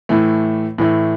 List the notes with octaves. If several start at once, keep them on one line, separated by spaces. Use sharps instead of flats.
A2 E3 A3
A2 E3 A3